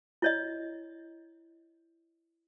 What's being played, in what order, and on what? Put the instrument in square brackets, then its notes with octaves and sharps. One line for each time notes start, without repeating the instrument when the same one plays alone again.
[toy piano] E4 C#5 D#5